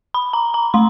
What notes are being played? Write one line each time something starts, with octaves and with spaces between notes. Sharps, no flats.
B5
A#5
A#5
A3 C6